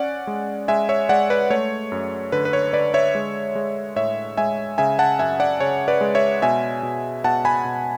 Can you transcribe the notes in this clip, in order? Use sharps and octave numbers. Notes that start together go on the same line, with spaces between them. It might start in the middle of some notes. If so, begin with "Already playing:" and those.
Already playing: C#4 D5 F#5
G#3
G#3 E5 G#5
C#5 E5
G#3 D5 F#5
B4 D5
A3 C#5
F#2
D3 B4
B4
C#5
D3 B4 D5
C#5 E5
G#3
G#3
A2 C#5 E5
G#3 E5 G#5
C#3 E5 G#5
F#5 A5
F#2 E5 G#5
D5 F#5
C#3 C#5
B4 D5
G#3
C#5 E5
B2 E5 G#5
B2
B2 F#5 A5
G#5 B5
B2